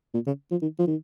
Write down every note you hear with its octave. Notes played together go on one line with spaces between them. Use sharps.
A#2
C#3
F3
D#3
F3
D#3